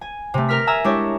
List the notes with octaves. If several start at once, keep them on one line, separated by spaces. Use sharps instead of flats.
G#5
C3 A3
A#4 F6 B6
E5 G#5 A#5 E6
G#3 D4 E4 G4 C#5